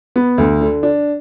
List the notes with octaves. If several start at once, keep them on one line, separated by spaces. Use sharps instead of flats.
B3
D2
D3
D4